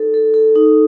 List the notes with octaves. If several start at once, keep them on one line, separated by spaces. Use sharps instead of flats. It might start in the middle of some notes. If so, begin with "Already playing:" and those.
Already playing: D#4 A4
A4
A4
D#4